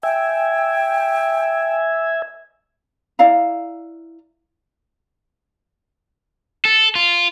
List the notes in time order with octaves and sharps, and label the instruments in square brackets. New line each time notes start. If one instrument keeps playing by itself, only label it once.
[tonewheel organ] E5 G#5 [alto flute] G5
[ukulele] E4 D5 F5 A#5
[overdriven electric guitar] A4
F4